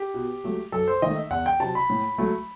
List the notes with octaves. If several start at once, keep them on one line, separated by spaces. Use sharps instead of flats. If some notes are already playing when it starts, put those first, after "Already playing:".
Already playing: G4
B2
F#3 A3
F#2 A4
C5
D#3 A3 D#5
E5
E2 F#5
G5
C3 F#3 A5
B5
A2
F#3 A3